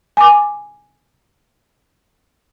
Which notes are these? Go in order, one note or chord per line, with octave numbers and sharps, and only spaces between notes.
G#5 D6